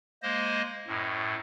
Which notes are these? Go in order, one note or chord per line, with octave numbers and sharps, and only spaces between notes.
G#3 A#3 C5 D#5
F#2 A2